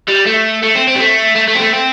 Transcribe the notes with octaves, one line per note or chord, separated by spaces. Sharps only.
G3
A3
A3
C4
C4
G3
A3
A3
A3
C4
A3
C4